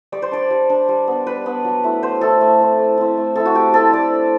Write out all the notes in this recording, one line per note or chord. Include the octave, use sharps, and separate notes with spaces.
G3 D5
C5
D4 D5
G3
D4
G3
B3 D4
G3 B4
B3 D4
F#3
A3 E4
F#3 C5
A3 E4 A4
A3
C4 E4
A3
C4 E4
A3
C4 E4 A4
F#4
A3 G4
C4 E4 A4
A3 D5
D4